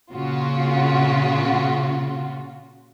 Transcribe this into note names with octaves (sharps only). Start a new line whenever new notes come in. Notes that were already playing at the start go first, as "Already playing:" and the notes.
A#2 C#3 F4 F#4